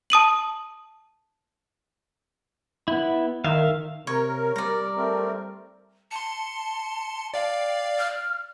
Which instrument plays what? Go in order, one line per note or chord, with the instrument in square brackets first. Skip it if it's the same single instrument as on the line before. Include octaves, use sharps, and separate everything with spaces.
[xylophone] A5 D#6 D#7 F#7
[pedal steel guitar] B3 E4
[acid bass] D#3 [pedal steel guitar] E5 F5
[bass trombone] C3 [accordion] A#4 [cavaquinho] C#5
[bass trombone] G3 [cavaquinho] D5 A#5
[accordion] A3 C4 A#4
[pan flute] A5 [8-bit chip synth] C6 C#7
[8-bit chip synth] D5 F5 [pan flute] G5
[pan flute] F6